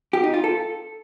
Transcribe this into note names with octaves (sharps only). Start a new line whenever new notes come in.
G4
D#4
F4
A4